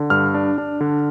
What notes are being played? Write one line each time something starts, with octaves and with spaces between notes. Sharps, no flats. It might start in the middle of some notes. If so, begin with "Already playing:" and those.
Already playing: D3
G2 F6
D4
D4
D3